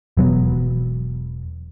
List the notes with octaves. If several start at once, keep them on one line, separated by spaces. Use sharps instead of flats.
E1 F#3 B3